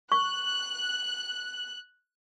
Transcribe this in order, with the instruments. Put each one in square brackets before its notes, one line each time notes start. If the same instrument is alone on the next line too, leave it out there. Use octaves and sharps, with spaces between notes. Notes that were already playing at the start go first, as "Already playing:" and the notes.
[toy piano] C#6 [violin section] F#6